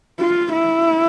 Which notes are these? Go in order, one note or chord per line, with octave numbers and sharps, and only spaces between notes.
F4
E4